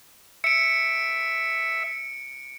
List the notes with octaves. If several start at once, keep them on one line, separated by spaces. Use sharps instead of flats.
E5 C#7 D7